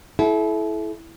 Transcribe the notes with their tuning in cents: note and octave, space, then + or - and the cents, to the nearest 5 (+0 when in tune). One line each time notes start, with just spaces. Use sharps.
E4 +0 A4 -40 F#5 +0